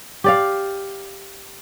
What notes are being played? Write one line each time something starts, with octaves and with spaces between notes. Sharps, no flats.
G4 D5 F5